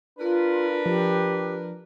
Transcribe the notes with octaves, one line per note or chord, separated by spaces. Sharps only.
D4 F4 A#4 B4
F3 G4